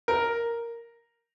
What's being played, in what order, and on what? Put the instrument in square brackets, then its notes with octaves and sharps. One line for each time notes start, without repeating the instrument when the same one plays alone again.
[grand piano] A#4